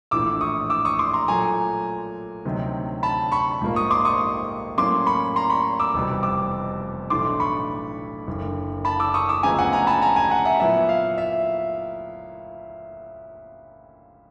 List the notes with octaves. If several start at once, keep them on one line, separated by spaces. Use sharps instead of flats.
A#1 A2 E3 A3 D4 D6 E6
C#6 D#6
D6 E6
C#6 D#6
C6 D6
A#5 C6
A#2 F#3 A3 G#5 A#5
D2 C3 D#3 F#3
A5 B5
B5 C#6
A#1 G#2 F3 A#3
C#6 D#6
C6 D6
C#6 D#6
A2 F#3 A#3 C#4 C6 D6
B5 C#6
A#5 C6
B5 C#6
D6 E6
F1 E2 B2 G3 C4
D6 E6
B1 A2 E3 A3 D4 C6 D6
B5 C#6
F#1 F#2 D3
A5 B5
D6 E6
C#6 D#6
D6 E6
D2 C#3 F3 G#3 B3 G#5 A#5
F#5 G#5
G#5 A#5
A5 B5
G#5 A#5
G#5 A#5
F#5 G#5
E5 F#5
A#2 F#3 B3 E4 E5
F5
E5